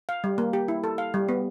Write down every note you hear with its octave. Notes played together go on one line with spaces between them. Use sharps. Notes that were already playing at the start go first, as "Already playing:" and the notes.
F5
G3
A#3
G4
E4
A4
F5
G3
B3